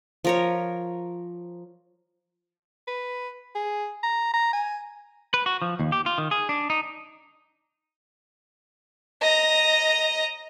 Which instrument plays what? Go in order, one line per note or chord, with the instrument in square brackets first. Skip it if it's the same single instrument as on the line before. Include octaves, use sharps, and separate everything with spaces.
[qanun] F3 A#4 C#5
[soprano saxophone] B4
G#4
A#5
A#5
G#5
[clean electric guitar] B4
F#4
F3
D#2
G4
F4
D#3
G#4
D4
D#4
[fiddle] D#5 A#5